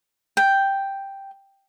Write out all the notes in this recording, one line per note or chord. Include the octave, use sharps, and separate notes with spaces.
G5